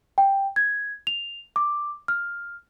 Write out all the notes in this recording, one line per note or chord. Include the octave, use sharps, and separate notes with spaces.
G5
G#6
F7
D6
F6